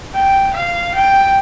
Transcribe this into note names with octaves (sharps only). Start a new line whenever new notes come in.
G5
F5
G5